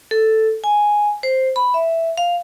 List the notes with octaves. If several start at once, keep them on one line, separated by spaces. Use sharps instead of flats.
A4
G#5
C5
B5
E5
F5